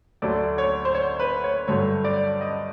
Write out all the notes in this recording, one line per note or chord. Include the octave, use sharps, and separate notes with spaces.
D2 D3 F#3 A3 D5
C#5
C5
C#5
B4
C#5
G2 D3 F#3 A3 C#5
D5
D#5